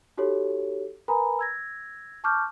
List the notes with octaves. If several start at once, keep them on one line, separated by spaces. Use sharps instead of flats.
D#4 F#4 G4 A4 C#5
A#4 B4 G#5 A#5 B5
E6 G#6 A#6
A5 C#6 D6 F6 G6